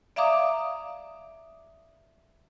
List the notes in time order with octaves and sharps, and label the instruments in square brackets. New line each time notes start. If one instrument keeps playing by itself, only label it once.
[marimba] D5 E5 F5 A#5 D6 D#6